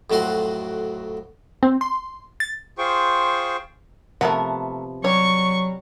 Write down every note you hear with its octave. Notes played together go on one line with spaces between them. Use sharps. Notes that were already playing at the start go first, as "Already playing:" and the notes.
F2 A2 F#3 F#4 C6
C4
C6
A6
F4 G#4 C5 G5 C#6
C3 F3 A3 B3 A#4 F#5
F#3 G3 C#5 C#6